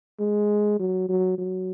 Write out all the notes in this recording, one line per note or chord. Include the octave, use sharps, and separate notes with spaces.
G#3
F#3
F#3
F#3